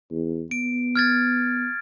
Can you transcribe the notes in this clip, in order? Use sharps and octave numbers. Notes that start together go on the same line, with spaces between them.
E2
B3 D7
F6 G#6 A6